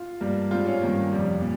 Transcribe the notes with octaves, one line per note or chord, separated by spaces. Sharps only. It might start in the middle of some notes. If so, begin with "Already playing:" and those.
Already playing: F4
G2 G3 A#3
G#2 G3 C4 F4
C#4
G2 D#3 A#3
F2 C3 G3
A#2